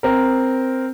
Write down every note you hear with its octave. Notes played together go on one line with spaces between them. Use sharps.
C4 A#4